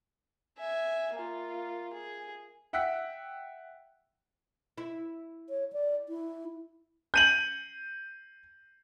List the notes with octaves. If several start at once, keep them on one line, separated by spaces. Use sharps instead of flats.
E5 G#5
A#3 F4
G#4
E5 F#5 G5 E6 F#6 B6
E4
C#5
D5
E4
G6 D#7 F#7